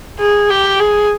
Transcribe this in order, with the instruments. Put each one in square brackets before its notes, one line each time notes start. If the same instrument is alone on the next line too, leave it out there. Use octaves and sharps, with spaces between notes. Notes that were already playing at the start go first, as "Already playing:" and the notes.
[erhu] G#4
G4
G#4